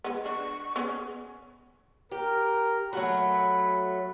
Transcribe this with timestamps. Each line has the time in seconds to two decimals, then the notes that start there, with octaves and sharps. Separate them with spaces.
0.04 G#3 B3
0.26 D4 C#6
0.76 B3 C#4 G#4
2.12 G4 A#4
2.93 F#3 A3 F#4 B5